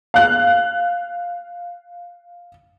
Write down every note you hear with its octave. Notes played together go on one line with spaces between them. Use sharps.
F5 F#6